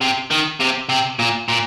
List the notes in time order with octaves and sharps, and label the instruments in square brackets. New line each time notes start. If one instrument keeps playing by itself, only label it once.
[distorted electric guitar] C3
D#3
C3
C3
A#2
A#2